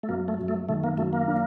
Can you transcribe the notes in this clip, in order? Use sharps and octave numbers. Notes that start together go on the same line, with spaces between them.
A3
F#2 A#3
A3
F#2
A3
D#3 A3
A#3
F#2 A3
A#3
D4